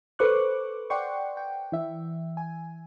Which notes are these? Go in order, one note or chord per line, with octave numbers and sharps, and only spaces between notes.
A4 B4 C5 C#6 D6 F#6
D5 F#5 G5 C6 C#6
G5
E3 E5
G#5